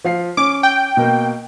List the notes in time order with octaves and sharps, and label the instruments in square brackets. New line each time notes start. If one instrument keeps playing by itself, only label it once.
[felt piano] F3 F5 C7
[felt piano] C#4 [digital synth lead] D6
[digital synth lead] G5
[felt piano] B2 A#3